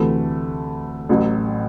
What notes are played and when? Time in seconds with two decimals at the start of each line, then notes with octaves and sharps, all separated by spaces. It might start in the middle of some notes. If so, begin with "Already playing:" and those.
Already playing: D2 C3 E3 A3
1.09 A1 A2 F#3